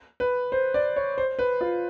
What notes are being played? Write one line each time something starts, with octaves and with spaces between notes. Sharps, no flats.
B4
C5
D5
C#5
C5
B4
F4